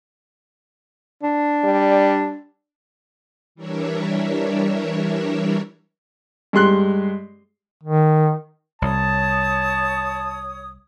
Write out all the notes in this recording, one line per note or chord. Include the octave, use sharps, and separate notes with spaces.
D4
G3
E3 G3 D4 A#4 C#5 E5
G2 G#3 C6 F#6
D#3
C2 C#5 A5 D#6